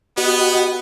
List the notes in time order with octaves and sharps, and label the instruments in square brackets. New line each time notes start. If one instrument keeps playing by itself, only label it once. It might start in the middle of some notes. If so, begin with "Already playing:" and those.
[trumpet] B3 [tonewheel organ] F#4 G4 D#5